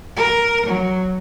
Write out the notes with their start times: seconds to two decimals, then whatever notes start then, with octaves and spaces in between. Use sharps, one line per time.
0.16 A#4
0.66 F#3